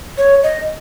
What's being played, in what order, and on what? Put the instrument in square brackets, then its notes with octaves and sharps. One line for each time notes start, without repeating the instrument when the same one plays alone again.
[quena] C#5
D#5